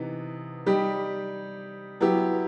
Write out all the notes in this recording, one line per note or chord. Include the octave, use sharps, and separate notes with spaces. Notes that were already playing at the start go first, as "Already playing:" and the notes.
Already playing: C3 E3 B3 D#4
G3 D#4 G4
F#3 B3 E4 G4